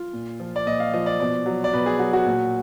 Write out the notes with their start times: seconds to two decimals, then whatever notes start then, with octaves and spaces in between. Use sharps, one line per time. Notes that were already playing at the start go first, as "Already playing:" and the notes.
Already playing: F4
0.13 A#2
0.40 F3
0.56 D5
0.66 A#2 D#5
0.80 F5
0.93 F3 D#5
1.06 D5
1.20 B2 D5
1.46 F#3
1.64 D5
1.73 B2 B4
1.86 G#4
1.99 F#3 F#4
2.13 F#4
2.26 A#2